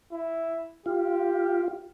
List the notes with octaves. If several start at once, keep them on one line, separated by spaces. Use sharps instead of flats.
E4
F4 G4